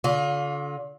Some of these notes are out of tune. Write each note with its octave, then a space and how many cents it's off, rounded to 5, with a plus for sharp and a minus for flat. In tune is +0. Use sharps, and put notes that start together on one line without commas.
D3 -35 F4 +25